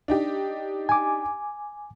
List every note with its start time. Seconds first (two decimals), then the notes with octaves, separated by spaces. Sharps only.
0.08 D4 D#4 G4
0.89 G#5 D6